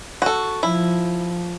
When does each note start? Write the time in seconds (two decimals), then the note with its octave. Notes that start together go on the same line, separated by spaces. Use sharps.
0.22 F#4 A4
0.63 F3 E4